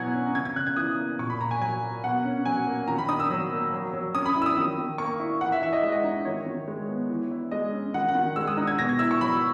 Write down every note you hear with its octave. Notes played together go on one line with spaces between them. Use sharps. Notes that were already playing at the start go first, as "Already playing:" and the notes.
Already playing: B2 F#3 E4 F#5 G#5 A#5 G#6
C#4
C#3 G#6
G#6
C#3 F#6
G#6
E3 D#6
A#3
A#2 C#6
B5
A#2 A#5
G#5
F#3 G#5
A#3
B2 F#5
C#4
F#3 G#5
A#3
D#3 A#5
B5
D#4 D#6
E6
F#3
A#3
F#3
F#3
C#4 D#6
B5
E4
E6
D#6
D#3
D#3
A#3 C#6
E4
E3 F#5
E5
E3 E5
D#5
G#3 E5
D#5
D#4
D#3 C#5
D#3
G#3
B3
E3
E4
G#3 D#5
C#4
D#3 F#5
F#5
D#3
G#3 E6
D#6
D#4 E6
G#6
B2 A#6
G#6
E4 E6
C#6
F#3 B5